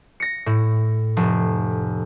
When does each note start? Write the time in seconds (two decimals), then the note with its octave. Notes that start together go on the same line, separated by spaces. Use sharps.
0.20 A#6 C#7
0.46 A2
1.17 F1